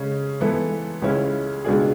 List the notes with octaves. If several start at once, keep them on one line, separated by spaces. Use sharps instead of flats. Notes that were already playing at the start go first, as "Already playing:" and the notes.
Already playing: C#3 G#3 C#4
G#2 E3 B3 E4 A4
C#2 C#3 G#3 C#4 E4
C#2 B2 G#3 D4 G#4